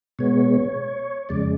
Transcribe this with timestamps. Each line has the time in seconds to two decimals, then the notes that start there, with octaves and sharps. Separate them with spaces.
0.19 B2 G#3 B3 C#5
1.29 F2 C#3 G#3 D5